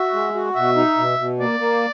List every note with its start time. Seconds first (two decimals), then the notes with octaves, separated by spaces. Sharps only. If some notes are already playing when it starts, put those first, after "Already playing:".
Already playing: F#4 E5
0.13 G#3
0.35 F#4
0.55 B2 E5
0.76 D#4
0.97 B2
1.19 B2
1.39 A#3 D5
1.60 A#3